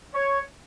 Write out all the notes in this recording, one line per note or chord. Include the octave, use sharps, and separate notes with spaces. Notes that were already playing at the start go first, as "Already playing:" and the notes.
C#5